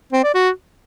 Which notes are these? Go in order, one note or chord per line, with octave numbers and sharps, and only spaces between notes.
C4
D5
F#4